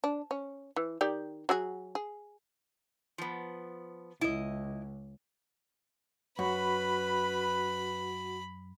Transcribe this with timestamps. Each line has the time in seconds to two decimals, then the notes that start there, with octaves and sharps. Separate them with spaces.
0.04 D4
0.31 C#4
0.76 E3
1.01 D#3 G4 D5
1.49 F#3 F#4 G#4
1.95 G#4
3.18 F3 B3
4.21 C#2 E4 D#5
6.39 F#2 F#4 B4 B5